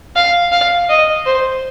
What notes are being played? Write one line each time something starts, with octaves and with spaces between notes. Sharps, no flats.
F5
F5
D#5
C5